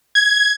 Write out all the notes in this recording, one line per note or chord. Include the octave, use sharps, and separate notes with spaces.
G#6